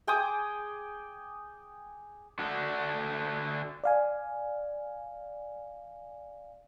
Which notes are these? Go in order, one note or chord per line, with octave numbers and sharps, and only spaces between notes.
G#4 G5 D6 D#6
D3 F#4 A4
D5 F5 G#5